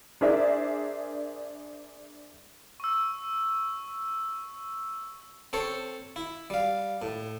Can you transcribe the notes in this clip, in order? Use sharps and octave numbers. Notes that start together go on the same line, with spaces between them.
D4 G#4 A#4 C5 D5 E5
C#6 E6
C4 A4 C5 C#5
E4
G3 F5
A2